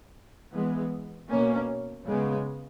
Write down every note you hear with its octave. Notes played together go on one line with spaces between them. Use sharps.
E3 G#3 B3
B2 A#3 C#4
C#3 G#3 B3